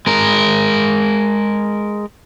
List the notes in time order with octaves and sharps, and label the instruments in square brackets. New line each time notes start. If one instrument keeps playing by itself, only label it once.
[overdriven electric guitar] G#3 A#4